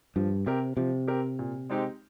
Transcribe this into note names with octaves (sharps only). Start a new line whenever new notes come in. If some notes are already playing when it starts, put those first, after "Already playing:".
G2 F3
C3 C4 G4 A#4
C3 F3
C4 G4 A#4
A#2
G#3 C4 D#4 G4